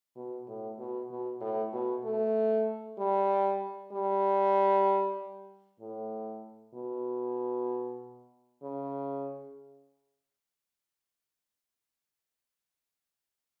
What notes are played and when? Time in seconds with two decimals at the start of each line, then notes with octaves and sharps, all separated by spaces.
0.16 B2
0.48 A2
0.78 B2
1.11 B2
1.41 A2
1.72 B2
2.04 A3
2.99 G3
3.92 G3
5.80 A2
6.74 B2
8.63 C#3